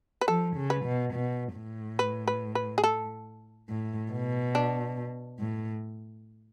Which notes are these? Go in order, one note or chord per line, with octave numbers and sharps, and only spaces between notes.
B4
F3 A4
C#3
B4
B2
B2
A2
B4
B4
B4
G#4
A4
A2
B2
D4
A2